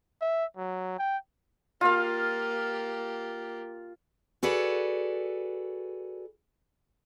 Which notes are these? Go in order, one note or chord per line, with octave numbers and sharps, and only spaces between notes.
E5
F#3
G5
A#3 F4 G4 F5
F#4 G#4 A4 B4 D5